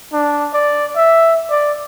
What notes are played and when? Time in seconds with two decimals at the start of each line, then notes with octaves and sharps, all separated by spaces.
0.13 D4
0.53 D5
0.96 E5
1.50 D5